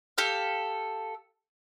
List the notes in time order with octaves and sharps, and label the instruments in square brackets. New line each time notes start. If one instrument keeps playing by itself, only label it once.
[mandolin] G4 A4 F5